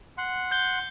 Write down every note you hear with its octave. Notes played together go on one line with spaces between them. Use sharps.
F#5 C6
G6 G7